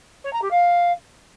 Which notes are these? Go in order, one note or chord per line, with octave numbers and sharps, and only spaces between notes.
C#5
A#5
G4
F5